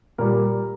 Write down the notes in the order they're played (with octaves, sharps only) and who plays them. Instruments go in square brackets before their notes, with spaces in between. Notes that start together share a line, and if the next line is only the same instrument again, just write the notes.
[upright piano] A#2 G3 A#4